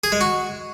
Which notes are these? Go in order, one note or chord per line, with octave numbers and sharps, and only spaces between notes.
G#4
G#3
F#4